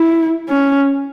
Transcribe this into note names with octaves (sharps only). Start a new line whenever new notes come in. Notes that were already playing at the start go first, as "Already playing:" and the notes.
Already playing: E4
C#4